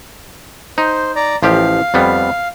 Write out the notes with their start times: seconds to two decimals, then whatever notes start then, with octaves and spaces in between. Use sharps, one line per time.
0.78 D#4 C5
1.16 D5 A#5
1.43 A1 F3 G4 F5
1.94 F2 G3 B3